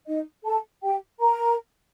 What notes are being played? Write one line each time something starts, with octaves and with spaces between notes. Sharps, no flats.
D#4 D#5
A4 A5
G4 G5
A#4 A#5